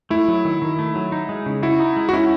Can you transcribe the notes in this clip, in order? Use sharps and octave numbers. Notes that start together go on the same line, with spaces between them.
A3 E4
F#3
D#3
D#3
A3
F#3
D#4
G#3
C#3
E4 F#4
D#4
G#3
F#4
C#4 E4